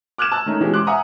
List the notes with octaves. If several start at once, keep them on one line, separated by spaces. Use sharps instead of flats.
D6 F6 F#6 G#6 E7
A5 E6 F#6
D#3 A3 C#4 D#4
B2 E3 G#3 C#4 G4
C6 D6 F#6
E5 F#5 G#5 A#5 D#6